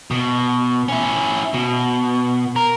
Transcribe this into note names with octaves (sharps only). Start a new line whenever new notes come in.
B2
C#4 E4
B2
A#4